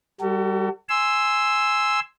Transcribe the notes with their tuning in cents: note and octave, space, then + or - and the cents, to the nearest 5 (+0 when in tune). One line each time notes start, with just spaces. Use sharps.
G3 +0 F#4 +40 A4 +40
G#5 +0 C6 +0 E6 +0